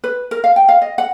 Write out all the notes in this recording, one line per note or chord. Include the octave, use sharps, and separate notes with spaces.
B4
A#4
F5
G5
F5
D#5
F#5